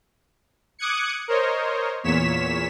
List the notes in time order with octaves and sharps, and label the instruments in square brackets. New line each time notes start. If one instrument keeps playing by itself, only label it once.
[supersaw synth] D6 D#6 F#6 G#6 C#7
A#4 C5 C#5 D#5
E2 A#2 C#5 B6 E7